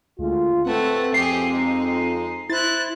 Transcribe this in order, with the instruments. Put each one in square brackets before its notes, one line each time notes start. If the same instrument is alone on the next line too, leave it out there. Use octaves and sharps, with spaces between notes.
[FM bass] D2 [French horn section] G#3 F4
[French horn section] A2 B4 [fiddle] A3 F#5 [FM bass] C4
[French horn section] F2 [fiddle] G4 G#4 [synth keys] C7
[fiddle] G#3 D#4
[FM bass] E4 [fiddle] C5 F#6 [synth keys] A6